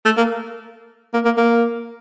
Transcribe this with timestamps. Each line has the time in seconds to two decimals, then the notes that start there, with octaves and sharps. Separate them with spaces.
0.05 A3
0.17 A#3
1.14 A#3
1.25 A#3
1.37 A#3